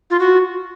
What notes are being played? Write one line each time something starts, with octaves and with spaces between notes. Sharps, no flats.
F4
F#4